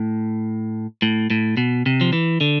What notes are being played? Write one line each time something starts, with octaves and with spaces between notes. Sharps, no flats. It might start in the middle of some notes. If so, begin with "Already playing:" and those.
Already playing: A2
A2
A2
B2
C3
F3
E3
D3